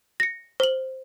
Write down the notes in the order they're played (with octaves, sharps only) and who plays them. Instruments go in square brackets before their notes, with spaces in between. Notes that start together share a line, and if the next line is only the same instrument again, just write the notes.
[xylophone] A#6 C#7
C5 F#7